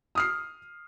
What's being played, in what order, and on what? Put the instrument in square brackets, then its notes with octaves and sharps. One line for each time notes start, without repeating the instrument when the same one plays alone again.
[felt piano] D#6 F6 C7